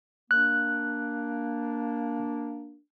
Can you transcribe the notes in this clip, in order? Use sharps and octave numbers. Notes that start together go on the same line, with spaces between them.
A#3 D4 F#6